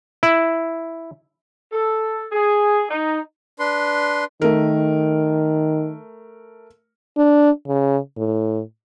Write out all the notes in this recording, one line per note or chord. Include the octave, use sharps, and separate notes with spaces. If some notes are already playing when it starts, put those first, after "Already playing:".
E4
A4
G#4
D#4
D4 B4 C6
D#3 A3 A#4
D4
C#3
A2